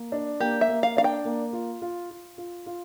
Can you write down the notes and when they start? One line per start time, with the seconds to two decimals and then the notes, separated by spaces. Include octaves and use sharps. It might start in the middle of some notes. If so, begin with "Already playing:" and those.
Already playing: A#3
0.12 D4
0.40 A#3 G4
0.61 E5
0.69 A#3
0.83 F5
0.97 D4 F5
1.04 G5
1.25 A#3
1.53 F4
1.82 F4
2.10 F4
2.38 F4
2.66 F4